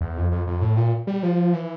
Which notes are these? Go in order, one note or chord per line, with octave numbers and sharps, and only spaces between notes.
E2
F2
F2
F2
A2
A#2
G3
F3
E3